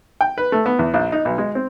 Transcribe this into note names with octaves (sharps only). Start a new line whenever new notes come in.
G5
B4
A3
B3
E2
A#1
D#4
B1
G#3
C4